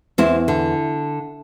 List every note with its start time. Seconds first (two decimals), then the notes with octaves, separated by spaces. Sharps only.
0.18 E2 C4 E4
0.48 D3